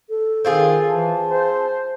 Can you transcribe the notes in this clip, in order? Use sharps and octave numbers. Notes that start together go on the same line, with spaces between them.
A4
D#3 C4 F4 G#4
E3 A5
C5